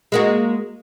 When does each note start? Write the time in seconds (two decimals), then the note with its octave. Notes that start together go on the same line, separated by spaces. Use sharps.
0.12 G#3 A#3 F#4